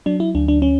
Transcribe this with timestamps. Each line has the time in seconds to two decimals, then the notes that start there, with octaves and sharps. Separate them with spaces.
0.06 F#3 D4
0.20 E4
0.35 D2 D4
0.48 D4
0.62 C#4